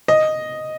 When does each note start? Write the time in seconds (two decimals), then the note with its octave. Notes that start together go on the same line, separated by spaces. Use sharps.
0.08 D#5